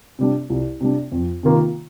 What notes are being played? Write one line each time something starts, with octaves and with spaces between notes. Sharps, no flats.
C3 G3 D4
C2
C3 G3 D4
F2
C3 D#3 A#3 F4